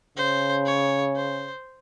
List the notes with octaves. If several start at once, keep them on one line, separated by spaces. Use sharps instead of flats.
C#3 C5
C#5
C5